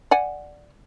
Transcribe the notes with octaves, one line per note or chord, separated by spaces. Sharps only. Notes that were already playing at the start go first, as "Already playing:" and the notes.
D5 F#5 G#5